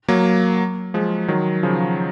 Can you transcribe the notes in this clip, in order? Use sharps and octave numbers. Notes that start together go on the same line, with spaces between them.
F#3 A#3
F3 G#3
D#3 F#3
C#3 F3